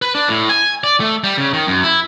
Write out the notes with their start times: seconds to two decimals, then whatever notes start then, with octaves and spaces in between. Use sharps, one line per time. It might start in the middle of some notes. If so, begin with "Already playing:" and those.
0.02 B4
0.15 D4
0.28 A2
0.49 G#5
0.84 D5
1.00 A3
1.24 G3
1.37 C#3
1.53 D#3
1.67 F#2
1.84 E4